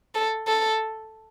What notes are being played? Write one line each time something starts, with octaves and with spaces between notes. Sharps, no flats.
A4
A4